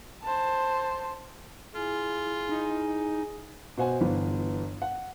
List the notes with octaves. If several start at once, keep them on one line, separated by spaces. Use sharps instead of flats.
C5 A5
E4 F4 G#4
D#4
B2 C5 F#5 G#5
G1 E3 B3
F#5